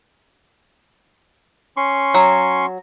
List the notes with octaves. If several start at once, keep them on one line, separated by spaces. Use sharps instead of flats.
C#4 C6 C#6
F#3